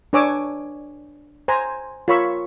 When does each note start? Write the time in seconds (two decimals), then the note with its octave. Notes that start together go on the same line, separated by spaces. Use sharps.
0.13 D4 B4 C#5 G#5 D6 E6
1.48 C5 G#5 A#5
2.08 F4 A#4 C#5 B5 C#6 E6